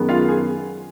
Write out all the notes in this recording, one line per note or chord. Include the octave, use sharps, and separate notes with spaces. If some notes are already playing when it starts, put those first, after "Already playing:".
Already playing: F#2 D#3 G#3 B3
F4 F5
G#4